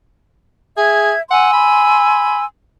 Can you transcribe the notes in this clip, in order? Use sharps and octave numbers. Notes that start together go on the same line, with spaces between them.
G#4 E5 G#6
F#5 G#5 C6 E6
B5